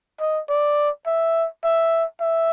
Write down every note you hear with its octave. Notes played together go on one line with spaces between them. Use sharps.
D#5
D5
E5
E5
E5